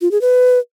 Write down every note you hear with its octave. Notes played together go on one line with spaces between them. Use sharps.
F4
G#4
B4